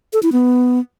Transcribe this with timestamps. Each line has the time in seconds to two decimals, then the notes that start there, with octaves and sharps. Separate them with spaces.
0.13 A4
0.23 E4
0.32 B3